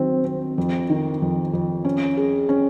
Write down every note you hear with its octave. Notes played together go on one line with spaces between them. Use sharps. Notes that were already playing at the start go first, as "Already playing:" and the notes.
Already playing: D#3 F#3 C4
C4
F2
D#3
F2
F2
C#4
G#4
C#4